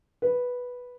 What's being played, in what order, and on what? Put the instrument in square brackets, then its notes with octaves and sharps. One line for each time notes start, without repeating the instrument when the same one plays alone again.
[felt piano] B4